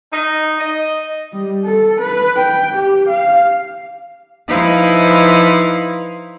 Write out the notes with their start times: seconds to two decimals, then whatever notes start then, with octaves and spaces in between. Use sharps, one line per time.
0.12 D#4
0.60 D#5
1.32 G3
1.65 A4
2.01 B4
2.37 G5
2.74 G4
3.09 F5
4.48 F3 D#4 E4 B4 F5